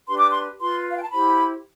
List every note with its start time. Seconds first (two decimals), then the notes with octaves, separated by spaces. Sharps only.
0.07 D4 G4 B4 C6
0.18 D6
0.29 C6
0.59 F4 B4 C6
0.90 F5
0.97 G5
1.03 A5
1.11 E4 G4 C5 B5